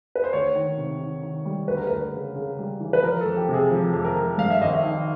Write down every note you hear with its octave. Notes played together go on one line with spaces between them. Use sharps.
B4
C5
D2 C#5
D#3
C3
D#3
D#3
G3
D2 B4
A#4
D2 B4
C#3
C#3
G3
E3
B4
F3 A#4
A4
F2
G4
C3
G#4
F3
F2
A#4
F2
G2 F5
E5
G#1 D#5
E5
D#3